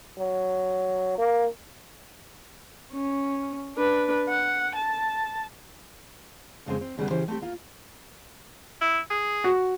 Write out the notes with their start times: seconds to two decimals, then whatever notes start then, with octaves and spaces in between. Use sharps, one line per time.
0.19 F#3
1.18 A#3
2.93 C#4
3.76 D4 B4
4.29 F#5
4.75 A5
6.66 F2 C#3 G#3 C4
6.81 C4
6.97 D#2 C#3 G3 B3
7.10 C#3 E3 C#4 G4 C5
7.28 A3 C4 G4
7.42 A#3 F4
8.81 E4
9.10 G#4
9.44 F#4